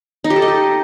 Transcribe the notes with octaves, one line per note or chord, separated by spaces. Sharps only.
D#4
G4
A4
D#5
A4